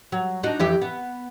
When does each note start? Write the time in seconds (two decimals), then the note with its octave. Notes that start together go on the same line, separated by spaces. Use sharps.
0.12 F#3
0.43 D4 D#4 F#4
0.60 F2 E3 G4
0.82 B3